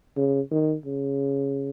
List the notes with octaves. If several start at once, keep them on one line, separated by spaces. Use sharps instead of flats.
C#3
D#3
C#3